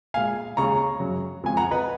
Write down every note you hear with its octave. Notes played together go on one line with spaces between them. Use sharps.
A#2 G#3 F5 G#5
D#2 C#3 G#3 A#5 C#6
F#2 C#3 F#3
F2 C#3 F3 G#3 G#5
F#5 A#5
B4 D#5